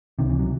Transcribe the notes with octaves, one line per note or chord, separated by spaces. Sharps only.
C#2 C3 D#3
E3
F#3